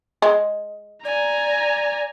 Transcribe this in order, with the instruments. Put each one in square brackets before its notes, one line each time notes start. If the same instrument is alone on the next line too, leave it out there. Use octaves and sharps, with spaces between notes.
[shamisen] G#3
[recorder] D5 [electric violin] G#5 A#5